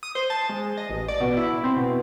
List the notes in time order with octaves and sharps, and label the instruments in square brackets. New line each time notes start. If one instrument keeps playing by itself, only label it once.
[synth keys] D#6
C5
A5
G#3
D#5
A1
D5
B2
E4
C4
B2